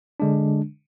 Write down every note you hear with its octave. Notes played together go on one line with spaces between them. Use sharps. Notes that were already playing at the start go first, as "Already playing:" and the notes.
D3 G#3 D4